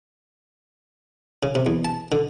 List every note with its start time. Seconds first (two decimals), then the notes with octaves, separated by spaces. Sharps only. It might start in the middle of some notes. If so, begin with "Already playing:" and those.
1.43 C#3
1.55 C3
1.66 E2
1.85 A5
2.12 D3